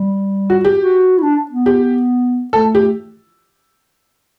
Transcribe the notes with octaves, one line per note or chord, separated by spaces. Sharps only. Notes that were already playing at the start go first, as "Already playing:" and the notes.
Already playing: G3
F#4
G4
F#4
E4
D4
B3
G4
A3 A4
G4